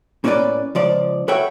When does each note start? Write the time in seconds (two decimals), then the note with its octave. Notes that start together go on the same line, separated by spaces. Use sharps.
0.24 A2 A#3 C#4 A#4 B4 D5
0.75 C#2 F3 D5
1.28 F#4 A4 B4 C#5 E5 G5